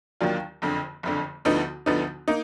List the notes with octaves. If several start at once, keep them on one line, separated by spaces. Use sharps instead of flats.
D#2 D#3 F#3 D4 F4
F#1 F2 D3
F#1 F2 D3
D2 D3 F3 B3 D#4
D2 D3 F3 B3 D#4
A#3 D#4